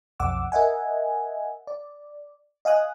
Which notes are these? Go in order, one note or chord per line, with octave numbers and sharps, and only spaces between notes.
B1 F2 F#5 D6 E6
A#4 D#5 E5 F#5 G#5
D5
D#5 F5 G#5 D#6 F#6